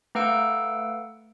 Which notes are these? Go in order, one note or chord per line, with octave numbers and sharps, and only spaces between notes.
A3 B4 F5 F#5 E6 D7